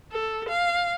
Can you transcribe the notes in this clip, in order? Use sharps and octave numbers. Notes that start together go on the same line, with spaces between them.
A4
F5